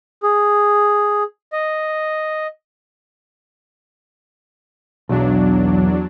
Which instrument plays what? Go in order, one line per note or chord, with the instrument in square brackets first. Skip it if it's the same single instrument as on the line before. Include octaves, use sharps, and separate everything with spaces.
[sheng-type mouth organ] G#4
D#5
[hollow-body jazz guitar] B1 [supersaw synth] E2 F#3 D4